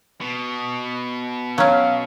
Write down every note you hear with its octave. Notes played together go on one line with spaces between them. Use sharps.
B2
F#3 C#4 F5